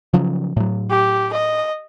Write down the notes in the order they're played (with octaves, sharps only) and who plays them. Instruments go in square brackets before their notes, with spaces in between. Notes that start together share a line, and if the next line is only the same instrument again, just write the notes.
[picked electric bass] C#3 F3 F#3
A2 F#3
[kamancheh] G4
D#5